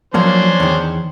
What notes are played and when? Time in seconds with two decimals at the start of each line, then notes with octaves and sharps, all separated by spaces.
0.14 F3 F#3 A#3 C#4 D4 C5
0.60 E2 D#3